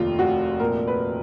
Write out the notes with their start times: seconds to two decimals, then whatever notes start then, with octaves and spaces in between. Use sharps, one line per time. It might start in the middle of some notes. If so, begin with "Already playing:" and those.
Already playing: F1 D#2 F4
0.19 F1 F#4
0.60 A#2 A#4
0.87 B4